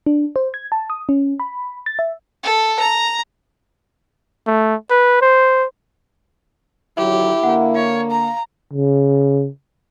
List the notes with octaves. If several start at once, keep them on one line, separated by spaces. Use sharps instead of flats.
D4
C5
G#6
A5
D#6
C#4
B5
A6
E5
A4
A#5
A3
B4
C5
D3 D#3 F#3 E4 G4
D3 A#3 F#5
C#5 F5
A#5
C#3